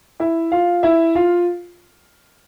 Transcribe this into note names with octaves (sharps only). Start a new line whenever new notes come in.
E4 E5
F4 F5
E4 E5
F4 F5